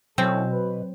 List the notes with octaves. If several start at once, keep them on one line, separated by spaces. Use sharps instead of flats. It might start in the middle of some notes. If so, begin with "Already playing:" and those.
B2 F#3 C4 C#4 E4 A4
B4